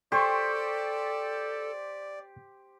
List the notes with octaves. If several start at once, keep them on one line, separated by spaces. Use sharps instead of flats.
G4 A4 C5 D5 C6 C#6